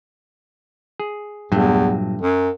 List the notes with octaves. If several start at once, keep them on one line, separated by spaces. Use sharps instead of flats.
G#4
E2 G2 A#2 F#3 A3
F#2